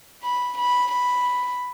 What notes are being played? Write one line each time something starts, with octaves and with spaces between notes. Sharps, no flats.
B5
B5
B5